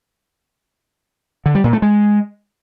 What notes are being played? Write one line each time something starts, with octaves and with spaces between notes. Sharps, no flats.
D3
G3
A#2
A3
G#3